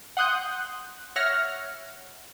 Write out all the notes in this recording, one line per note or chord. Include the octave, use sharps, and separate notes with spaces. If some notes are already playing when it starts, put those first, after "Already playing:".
F#5 C6 D#6 F#6 G6
C#5 E5 F#5 F6 A#6